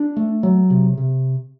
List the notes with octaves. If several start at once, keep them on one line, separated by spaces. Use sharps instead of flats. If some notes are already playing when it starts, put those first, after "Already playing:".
Already playing: D4
A3
F#3
C3
C3